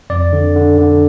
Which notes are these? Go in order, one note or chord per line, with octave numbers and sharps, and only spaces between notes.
F2 D5
D3
D3
D3